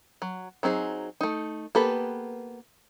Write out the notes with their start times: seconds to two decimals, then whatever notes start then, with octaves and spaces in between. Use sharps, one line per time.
0.22 F#3
0.63 F#3 C4 D#4 G#4
1.21 A3 D#4
1.75 A#3 B3 G4 A4 B4